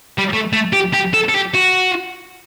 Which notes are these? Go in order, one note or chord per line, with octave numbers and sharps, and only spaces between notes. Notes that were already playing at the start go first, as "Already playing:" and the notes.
G3
A3
A3
G4
G4
A4
A4
G4
F#4